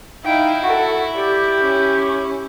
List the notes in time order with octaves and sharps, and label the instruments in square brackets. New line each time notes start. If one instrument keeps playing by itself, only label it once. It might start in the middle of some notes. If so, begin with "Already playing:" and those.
[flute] D#4 [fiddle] E4 [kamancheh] F5 G5
[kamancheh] F#4 A4 [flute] F#5
[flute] G4 [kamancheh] D5
[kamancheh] C#4